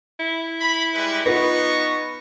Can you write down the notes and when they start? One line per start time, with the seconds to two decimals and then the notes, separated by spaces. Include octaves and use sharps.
0.20 E4
0.60 B5
0.94 G3 G#3 B4
1.26 B3 D#4 F4 B4 C#6